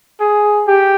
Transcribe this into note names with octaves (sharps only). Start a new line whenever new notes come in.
G#4
G4